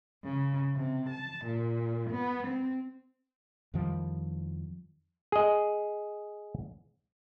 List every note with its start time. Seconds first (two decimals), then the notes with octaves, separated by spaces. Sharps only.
0.25 C#3
0.76 C3
1.11 A5
1.47 A#2
2.12 B3
2.46 C4
3.74 F2 D#3 F3 G3
5.32 G#4 D#5